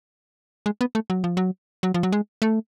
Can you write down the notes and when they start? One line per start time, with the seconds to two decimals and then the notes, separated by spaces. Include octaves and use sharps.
0.66 G#3
0.81 B3
0.95 A3
1.10 F#3
1.24 F3
1.37 F#3
1.83 F#3
1.94 F3
2.03 F#3
2.12 G#3
2.42 A3